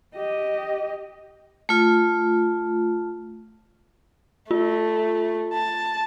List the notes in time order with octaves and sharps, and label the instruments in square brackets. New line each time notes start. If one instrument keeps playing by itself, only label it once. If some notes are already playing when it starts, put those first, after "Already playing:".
[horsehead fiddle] G4 D#5
[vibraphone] A3 F4
[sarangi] A3 [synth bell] F4
[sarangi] A5